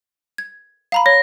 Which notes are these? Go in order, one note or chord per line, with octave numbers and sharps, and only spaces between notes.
G#6
F5 A#5 B5
C#5 A#6